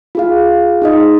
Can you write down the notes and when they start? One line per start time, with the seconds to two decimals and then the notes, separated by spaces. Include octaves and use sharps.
0.15 F4 G#4 F5
0.82 D#4 G#4 D#5